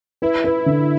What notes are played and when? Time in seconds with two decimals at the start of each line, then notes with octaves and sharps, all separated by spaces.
0.22 E4 B4
0.44 B4
0.66 D3